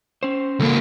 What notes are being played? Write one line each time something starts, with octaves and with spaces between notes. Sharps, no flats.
C#4 C5
C#2 G3 A#3 A4